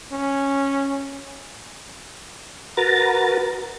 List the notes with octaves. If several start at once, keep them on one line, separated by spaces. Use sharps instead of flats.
C#4
F#4 A#4 B4 A#5 A6